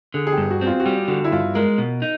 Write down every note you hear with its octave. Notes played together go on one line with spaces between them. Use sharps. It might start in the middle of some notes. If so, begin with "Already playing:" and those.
D3 G#4
G#4
G4
G2
F#4
C4
F4
F#4
G3 G4
D3 F#4
E4
G2 F4
G#3 A#4
B2
D#4